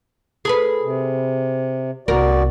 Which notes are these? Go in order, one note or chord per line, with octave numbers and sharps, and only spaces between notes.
G#4 A4 B4
C3
C2 B3 F#4 A#4 D5